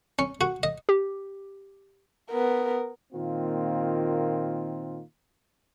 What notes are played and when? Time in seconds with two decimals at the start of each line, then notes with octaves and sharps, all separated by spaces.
0.19 C#4
0.41 F#4
0.63 D#5
0.89 G4
2.31 B3 A#4
3.13 A#2 D#3 A#3 C4 F4